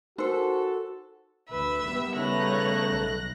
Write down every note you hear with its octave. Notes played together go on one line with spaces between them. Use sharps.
D#4 F#4 A4 A#4 C5
D2 B4 E5
D#3 G3 B3
C#3 A3 D#4 B4 C#5 F#6 A#6
B1